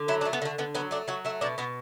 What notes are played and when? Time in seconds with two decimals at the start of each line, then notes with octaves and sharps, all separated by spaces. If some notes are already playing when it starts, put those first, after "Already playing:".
Already playing: D3
0.08 F#3 E4
0.21 D4
0.25 A3
0.33 B3
0.42 D3 A3
0.58 D3 B3
0.75 F#3 B3
0.91 A3 D4
1.08 F#3 F#4
1.25 A3 E4
1.41 B2 D4
1.58 B2 B3